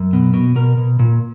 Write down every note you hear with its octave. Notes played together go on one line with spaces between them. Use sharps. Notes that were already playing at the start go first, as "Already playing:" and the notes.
Already playing: F#2
B2
B2
B2 A#4
B2
A#2